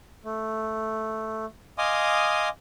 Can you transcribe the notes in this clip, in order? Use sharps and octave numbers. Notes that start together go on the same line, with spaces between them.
A3
D#5 F5 G#5 C6 D6 D#6